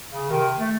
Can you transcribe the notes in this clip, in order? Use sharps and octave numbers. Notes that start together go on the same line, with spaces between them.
C#3
C3 D#3
A3